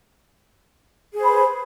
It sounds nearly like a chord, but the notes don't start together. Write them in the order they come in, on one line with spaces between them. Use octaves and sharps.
G#4 C5 B5 B4